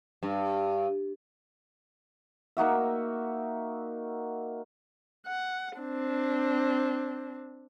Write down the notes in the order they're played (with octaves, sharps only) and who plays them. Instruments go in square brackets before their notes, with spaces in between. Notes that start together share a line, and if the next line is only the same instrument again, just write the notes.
[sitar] G2
[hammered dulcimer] A#3 D#4 F#4 E5
[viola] F#5
C4 D4